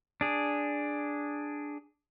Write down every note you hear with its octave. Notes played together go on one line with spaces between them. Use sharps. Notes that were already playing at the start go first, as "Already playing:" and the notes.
D4 G#4